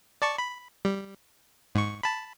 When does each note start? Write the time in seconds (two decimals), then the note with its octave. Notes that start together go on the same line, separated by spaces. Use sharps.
0.22 D5 A5 C#6
0.38 B5
0.85 G3
1.75 G#2 C#6
2.03 A5 B5